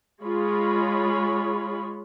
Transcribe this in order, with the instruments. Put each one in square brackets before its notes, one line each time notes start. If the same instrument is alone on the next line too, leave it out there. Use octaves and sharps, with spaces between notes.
[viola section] G#3 F4 G#4 C#5 B5